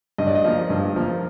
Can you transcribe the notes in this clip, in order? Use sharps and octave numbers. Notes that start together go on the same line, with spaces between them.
G2 D#5
D5
D#5
F3 A#3
G2
F3 A#3